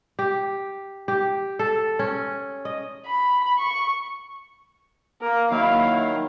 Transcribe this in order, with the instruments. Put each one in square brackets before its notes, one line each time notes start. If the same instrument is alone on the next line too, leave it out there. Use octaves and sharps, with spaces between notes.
[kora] G4
G4
A4
C#4
D#5
[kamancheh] B5
C#6
[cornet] A#3 [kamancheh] A#4
[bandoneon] D#3 F#3 [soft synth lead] A#3 [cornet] E4 [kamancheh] F5